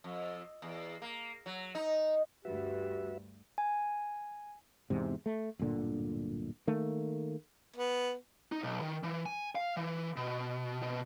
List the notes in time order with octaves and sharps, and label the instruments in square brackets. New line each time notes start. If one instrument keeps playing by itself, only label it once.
[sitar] F2
E2
A#3
F#3
D#4
[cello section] D2 G2 [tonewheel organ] F#4 B4 E5 [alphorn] G4
[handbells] G#5
[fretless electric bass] E2 G#2 C3
A3
D1 G1 A#2 D3
D#3 A3 A#3
[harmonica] B3
[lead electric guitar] D#4
B1
D#3
E3
G#5
F5
E3
B2
B2